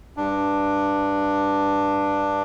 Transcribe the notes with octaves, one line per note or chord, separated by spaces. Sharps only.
G2 D4